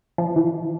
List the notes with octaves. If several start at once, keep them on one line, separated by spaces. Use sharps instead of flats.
F3
E3